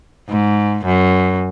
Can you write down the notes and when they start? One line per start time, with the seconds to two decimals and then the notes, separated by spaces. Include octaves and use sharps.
0.29 G#2
0.86 F#2